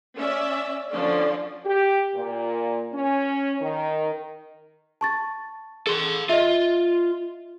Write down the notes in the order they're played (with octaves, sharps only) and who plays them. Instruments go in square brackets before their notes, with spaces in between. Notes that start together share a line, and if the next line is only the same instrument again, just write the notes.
[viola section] C#4 D5 E5
D3 F3 C#4 D4 D5
[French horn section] G4
A#2
C#4
D#3
[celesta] A5 C#6 A6
[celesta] G#4 [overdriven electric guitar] A4 C6
[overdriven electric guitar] F4 [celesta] D#5 E5